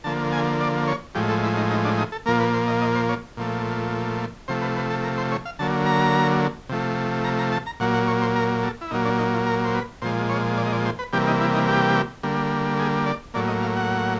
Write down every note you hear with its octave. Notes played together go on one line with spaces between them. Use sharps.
D3 F3 A#3 A5
G#5
D5
C#5
A2 F3 G#3 G4
A4
E4
D#4
D#4
D4
D#4
A4
A#2 F3 A#3 A#4
B4
C5
D#5
D#5
C5
C#5
A#2 F3 A3
C3 F3 A3 C5
B4
B4
A4
A#4
C5
C#5
F5
D3 F#3 A#3 A5
A#5
C3 F3 A3
A#5
A#5
A5
A#5
A#2 F#3 A#3 F#5
F#5
C#5
C5
A#4
A4
E4
A#2 F#3 A#3 D#4
D4
D#4
F4
A#4
C5
B4
A#2 F3 G#3 C5
C#5
D5
D#5
D5
C5
B4
C3 E3 G3 A#3 G4
D#4
E4
D#4
G4
D3 G3 A#3
G#4
D5
A2 F#3 A#3 D5
D#5
F5
F#5